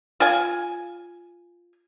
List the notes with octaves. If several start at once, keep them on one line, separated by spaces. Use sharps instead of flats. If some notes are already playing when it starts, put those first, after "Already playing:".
F4 G#5